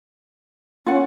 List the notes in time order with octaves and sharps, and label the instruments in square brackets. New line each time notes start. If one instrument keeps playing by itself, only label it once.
[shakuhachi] C#4 [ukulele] F4 F#5